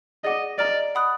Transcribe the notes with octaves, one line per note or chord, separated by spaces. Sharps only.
G#4 D5 D#5 F#5 D6
D5 D#5 A#5 F6
F#5 B5 D#6 F#6